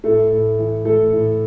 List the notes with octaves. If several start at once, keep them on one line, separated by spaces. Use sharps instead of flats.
A2 A3 A4
A2
E3
E3 A3 A4
A2